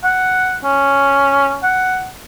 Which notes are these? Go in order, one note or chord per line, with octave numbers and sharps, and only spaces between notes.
F#5
C#4
F#5